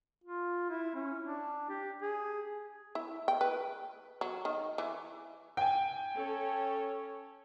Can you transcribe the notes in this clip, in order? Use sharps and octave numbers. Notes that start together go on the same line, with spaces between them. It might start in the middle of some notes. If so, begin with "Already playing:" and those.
F4
E4
C#4
D4
G4
G#4
E4
G5
B4
F#3
D#3
E3
G5 G#5
C#4 A4 C#5